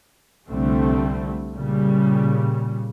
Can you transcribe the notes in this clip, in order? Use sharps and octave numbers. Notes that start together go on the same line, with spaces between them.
C2 D3 G3 A3 C4
A#2 C#3 G3